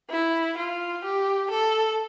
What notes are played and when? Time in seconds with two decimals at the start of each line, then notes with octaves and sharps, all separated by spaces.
0.10 E4
0.57 F4
1.04 G4
1.51 A4